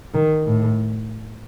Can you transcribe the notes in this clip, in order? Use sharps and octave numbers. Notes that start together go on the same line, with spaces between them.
D#3
A2